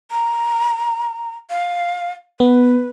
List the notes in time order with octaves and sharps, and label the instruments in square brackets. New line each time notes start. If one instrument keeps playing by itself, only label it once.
[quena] A#5
F5
[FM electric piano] B3 [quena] B4